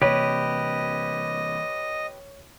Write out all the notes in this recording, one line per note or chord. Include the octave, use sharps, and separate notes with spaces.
C3 E3 A#3 G4 B4 C#5 D#5